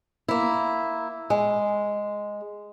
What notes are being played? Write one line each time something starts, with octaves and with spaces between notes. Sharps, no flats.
A#3 E4
G#3